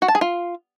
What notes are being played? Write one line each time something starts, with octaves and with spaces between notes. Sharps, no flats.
F#4
A5
G#4
F4